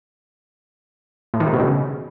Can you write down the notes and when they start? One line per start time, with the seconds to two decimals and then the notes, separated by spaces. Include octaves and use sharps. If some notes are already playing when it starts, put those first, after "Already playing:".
1.34 A2
1.40 D#3
1.47 C3
1.53 B2
1.60 C#3